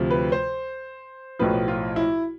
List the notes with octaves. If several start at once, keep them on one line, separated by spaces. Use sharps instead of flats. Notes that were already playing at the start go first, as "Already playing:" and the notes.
Already playing: D2 C3 F3
B4
C5
B1 A2 F3 B4
F4
E4